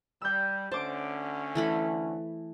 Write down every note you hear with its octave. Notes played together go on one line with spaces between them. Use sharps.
G3 E6 G6
D2 D3 C#4 C5 A5 D6 D7
E3 A3 B5